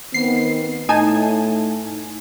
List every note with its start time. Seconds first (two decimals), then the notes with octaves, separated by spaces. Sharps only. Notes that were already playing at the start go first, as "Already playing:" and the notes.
0.14 D#3 B3 C4 C7
0.89 A2 A3 D#4 G#5 A5